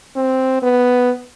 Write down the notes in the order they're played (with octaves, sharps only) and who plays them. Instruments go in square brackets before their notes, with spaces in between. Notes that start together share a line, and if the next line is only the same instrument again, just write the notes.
[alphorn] C4
B3